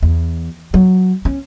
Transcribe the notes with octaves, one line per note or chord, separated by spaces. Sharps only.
E2
F#3
C#4